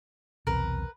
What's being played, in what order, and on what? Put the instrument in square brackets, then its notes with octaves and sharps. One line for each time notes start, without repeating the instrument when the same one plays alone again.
[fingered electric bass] B1 E2 C3 [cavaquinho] A#4 B4